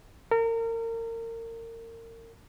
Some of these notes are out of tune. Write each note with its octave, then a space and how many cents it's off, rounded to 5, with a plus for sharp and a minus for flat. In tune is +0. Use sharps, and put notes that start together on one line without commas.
A#4 -30